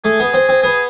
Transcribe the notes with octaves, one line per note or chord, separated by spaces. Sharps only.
A3 G#4
B3
C4
C4
B3 G#4